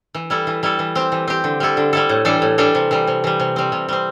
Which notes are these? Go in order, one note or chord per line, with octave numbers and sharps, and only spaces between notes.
E3
G3 E4 A4
E3
G3 E4 A4
E3
C4 G4
E3
C4 G4
D3
G3 E4 A4
D3
G3 E4 A4
A2
E3 G3 D4 A4
A2
E3 G3 D4 A4
C3
E3 G3
C3
E3 G3
C3
G3 C4
C3
G3 C4